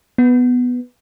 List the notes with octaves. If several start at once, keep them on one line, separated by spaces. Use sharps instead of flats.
B3